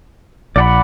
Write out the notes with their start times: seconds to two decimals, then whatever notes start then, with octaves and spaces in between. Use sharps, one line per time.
0.56 A#1 D5 F#5 B5